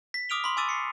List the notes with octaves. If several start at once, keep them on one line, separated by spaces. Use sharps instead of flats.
B6
D6 D#6 F6 D7 F7 G7
B5 C6
G#5 C#6 D6 E6 A6 D#7
C7 C#7